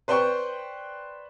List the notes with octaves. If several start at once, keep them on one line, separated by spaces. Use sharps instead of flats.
B4 C5 D5 G5 C6 C#6